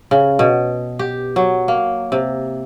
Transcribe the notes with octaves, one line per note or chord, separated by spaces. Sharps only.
C#3
B2
G4
F#3
A#3
C3